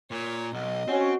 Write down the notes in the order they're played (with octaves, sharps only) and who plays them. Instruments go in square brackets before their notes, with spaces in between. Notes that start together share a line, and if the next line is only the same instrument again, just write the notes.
[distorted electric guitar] A#2 [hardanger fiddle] C#5
[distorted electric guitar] B1 [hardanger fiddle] D#5
[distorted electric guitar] C4 [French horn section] C#4 [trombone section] F#4